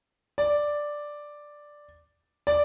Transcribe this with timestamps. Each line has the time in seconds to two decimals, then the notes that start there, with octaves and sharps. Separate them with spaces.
0.38 D5
2.47 D5